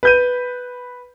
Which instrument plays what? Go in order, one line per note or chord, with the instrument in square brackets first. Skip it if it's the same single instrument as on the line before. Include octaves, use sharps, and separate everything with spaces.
[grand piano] B4 G6 D#7